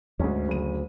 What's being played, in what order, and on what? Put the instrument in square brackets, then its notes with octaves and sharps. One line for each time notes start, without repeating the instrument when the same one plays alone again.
[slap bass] D2 [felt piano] G#2 C#4
[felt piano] F#1 D#7